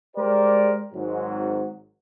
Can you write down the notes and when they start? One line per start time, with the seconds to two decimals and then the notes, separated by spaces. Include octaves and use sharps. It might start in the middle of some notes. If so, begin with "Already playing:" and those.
0.17 G#3 G4 A#4 C5 D5
0.93 G#1 G#2 F#3